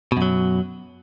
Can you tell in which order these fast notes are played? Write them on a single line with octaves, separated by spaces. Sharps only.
B2 F#2 F#3